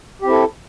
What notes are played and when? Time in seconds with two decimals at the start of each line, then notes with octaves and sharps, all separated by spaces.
0.21 G4
0.25 C4
0.28 E4
0.31 A4